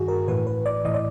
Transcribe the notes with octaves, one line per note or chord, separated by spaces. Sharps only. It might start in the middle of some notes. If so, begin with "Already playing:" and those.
Already playing: G2 D#3 F#4 G#4
A#4
A2 E3 B4
B4
D5
A2 E3 D#5
D5